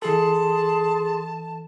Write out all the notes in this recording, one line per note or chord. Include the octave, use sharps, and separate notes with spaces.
E3 G#4 A4 A5 C6